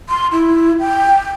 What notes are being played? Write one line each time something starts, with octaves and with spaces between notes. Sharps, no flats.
C6
E4
G5